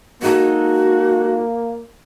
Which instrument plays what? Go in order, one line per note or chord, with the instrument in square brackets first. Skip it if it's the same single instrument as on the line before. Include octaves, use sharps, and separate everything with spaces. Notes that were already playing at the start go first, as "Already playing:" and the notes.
[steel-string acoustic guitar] G#3 D#4 A4 [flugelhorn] A#3 [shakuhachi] F#4